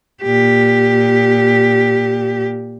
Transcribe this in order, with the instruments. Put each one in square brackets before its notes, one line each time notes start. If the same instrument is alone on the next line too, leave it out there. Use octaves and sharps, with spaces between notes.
[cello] A#2 G4